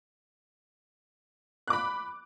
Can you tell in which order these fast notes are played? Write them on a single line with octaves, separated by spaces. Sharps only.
F#6 D6 B5